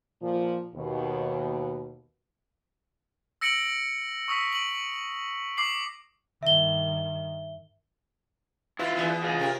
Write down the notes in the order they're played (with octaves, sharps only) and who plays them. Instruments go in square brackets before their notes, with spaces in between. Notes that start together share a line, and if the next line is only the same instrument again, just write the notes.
[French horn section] A#2 F3
D#2 B2
[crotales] E6 A#6 C#7 D7 F#7
C#6 D#6 E6 B6
D7 F#7
D6 C7 F#7
[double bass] G2 D#3 [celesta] E5 G7
[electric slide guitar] E4 F4 [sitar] B4
[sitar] E2 D3 B3
[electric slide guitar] F4 G#4
[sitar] C3 A#4